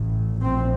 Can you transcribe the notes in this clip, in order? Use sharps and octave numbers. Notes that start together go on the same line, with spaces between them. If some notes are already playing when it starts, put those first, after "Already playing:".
Already playing: A1 A2
A#1 A2 C4